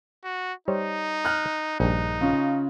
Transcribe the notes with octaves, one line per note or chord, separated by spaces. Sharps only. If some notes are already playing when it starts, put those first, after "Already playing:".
F#4
G3 D#4 C5 C#5
F6 F#6
A#1 G2 D#4
C#3 C#4 F4